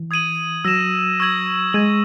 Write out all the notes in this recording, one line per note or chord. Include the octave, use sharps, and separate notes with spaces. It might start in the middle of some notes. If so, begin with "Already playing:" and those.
Already playing: E3
D#6 G#6 D#7 F#7
F#3 E6 A#6 E7
C#6 E6 G#6 D#7 F#7
G#3 G#6 D#7 F#7